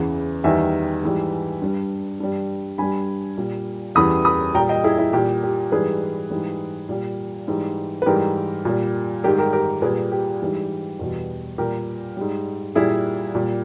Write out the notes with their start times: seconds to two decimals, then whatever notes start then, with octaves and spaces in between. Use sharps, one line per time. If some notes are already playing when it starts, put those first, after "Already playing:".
Already playing: E2 C#3 E3
0.44 E2 D#3 G3 E5 G#5
1.03 G#2 E3 G3
1.62 G2 G3
2.20 G2 G3
2.78 G2 G3 G#5 B5
3.37 A#2 G3
3.95 E2 C#3 E3 G3 B5 D#6
4.25 B5 D#6
4.54 A#2 G3 G5 A#5
4.69 D#5 G5
4.84 E4 G#4
4.98 E4
5.13 A#2 G3 G4
5.43 G4
5.72 G#2 E3 G3 G#4 B4
6.30 G#2 E3 G3
6.89 A#2 G3
7.48 G#2 E3 G3
8.02 B4
8.06 G#2 E3 G3 G4 A#4
8.65 A#2 G3
9.24 G#2 D#3 G3 G4 A#4
9.38 G4 A#4
9.53 G4 A#4
9.82 A#2 G3 G#4 B4
10.12 G4
10.42 G#2 E3 G3
10.99 E2 B2 G3
11.58 A#2 G3 G4 A#4
12.17 G#2 G3
12.75 A#2 G3 E4 G#4
13.35 A#2 G3